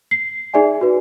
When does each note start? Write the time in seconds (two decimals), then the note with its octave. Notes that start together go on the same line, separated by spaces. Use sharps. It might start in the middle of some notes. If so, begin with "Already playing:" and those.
0.11 C7
0.54 D#4 G#4 D5 E5 G#5
0.81 F#4 B4